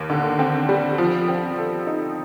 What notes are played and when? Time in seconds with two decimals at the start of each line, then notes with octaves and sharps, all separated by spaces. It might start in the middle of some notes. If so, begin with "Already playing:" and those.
Already playing: D#2
0.10 D3
0.39 C4
0.69 G3
0.98 F3
1.28 C4
1.58 A4
1.87 D#4